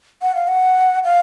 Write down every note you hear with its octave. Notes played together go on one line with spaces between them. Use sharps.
F#5
F5
F#5
F5